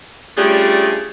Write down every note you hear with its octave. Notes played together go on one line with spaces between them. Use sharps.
G3 A3 C#4 D4 F4 G#4